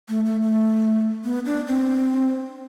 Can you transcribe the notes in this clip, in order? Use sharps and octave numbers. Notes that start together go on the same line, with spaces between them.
A3
A3
A3
B3
D4
C4